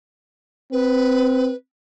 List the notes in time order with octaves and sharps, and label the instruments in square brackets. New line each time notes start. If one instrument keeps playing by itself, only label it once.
[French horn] C4 [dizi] B4